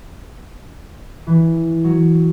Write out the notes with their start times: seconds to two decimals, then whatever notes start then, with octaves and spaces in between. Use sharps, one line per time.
1.27 E3
1.84 F#3